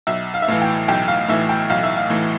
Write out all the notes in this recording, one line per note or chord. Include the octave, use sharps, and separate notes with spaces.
B1 E5
F5
E5
A2 E3 F5
G5
B1 G5
F5
A2 E3 E5
G5
B1 F5
E5
F5
A2 E3